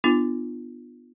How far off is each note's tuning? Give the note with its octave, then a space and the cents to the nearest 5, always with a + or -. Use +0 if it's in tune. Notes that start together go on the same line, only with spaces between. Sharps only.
B3 +0 D4 +25 F4 -15